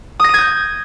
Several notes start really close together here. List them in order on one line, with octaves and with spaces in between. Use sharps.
D#6 A#6 D#7 G#6 G6